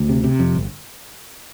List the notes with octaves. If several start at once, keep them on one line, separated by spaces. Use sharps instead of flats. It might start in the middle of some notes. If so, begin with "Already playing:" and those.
Already playing: D2
C3
C3
F2
G1